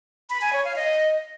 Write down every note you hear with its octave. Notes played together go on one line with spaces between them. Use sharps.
B5
G#5
C#5
F5
D#5